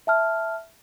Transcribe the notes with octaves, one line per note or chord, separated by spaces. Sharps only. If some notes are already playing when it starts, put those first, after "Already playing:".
E5 A5 F6